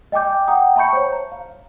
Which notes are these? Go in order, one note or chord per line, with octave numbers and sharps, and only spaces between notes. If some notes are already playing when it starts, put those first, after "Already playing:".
D#5 G5 G#5 D6 G6
F#5 G5 A#5 D#6
E5 A5 B5 C#6 G6 C#7
C5 C#5
A#5
F5